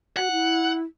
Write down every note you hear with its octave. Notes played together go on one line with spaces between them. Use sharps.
F#4 F#5
E4